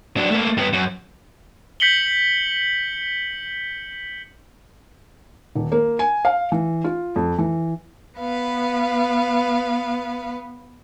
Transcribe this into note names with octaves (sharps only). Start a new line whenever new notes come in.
F#3 D4
A3 A#3
G2 B3
F#2
G6 B6 C#7 F#7 G7
D#1
A#3
G#5
F5
E3
F4
F2
E3
B3 B4 F5